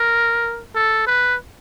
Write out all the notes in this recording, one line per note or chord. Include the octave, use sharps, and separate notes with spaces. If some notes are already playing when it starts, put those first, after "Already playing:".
Already playing: A#4
A4
B4